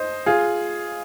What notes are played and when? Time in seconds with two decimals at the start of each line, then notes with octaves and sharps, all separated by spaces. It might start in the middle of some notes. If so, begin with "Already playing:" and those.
Already playing: C5 D#5
0.26 F4 G#4